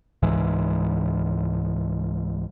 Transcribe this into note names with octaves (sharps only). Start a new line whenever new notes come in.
C#2 G#2 E3